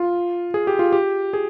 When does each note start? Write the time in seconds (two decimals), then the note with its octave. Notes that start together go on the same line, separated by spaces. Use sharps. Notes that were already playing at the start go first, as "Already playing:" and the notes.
Already playing: F4
0.54 G#4
0.67 G4
0.79 F4
0.92 G4
1.33 G#4